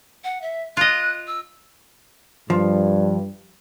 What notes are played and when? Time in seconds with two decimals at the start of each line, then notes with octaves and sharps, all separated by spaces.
0.24 F#5
0.42 E5
0.77 F4 D#5 F#6
1.27 E6
2.50 G2 F3